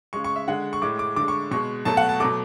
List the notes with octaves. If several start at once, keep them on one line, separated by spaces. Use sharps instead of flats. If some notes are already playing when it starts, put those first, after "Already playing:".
C#3 G#3 C#6
C#6
E5
D3 G#3 F#5
C#6
A2 G#3 D6
D6
D3 G#3 D6
C#6
B2 G#3 C#6
B2 F#3 A3 A5
F#5
A5
B2 F#3 A3 D6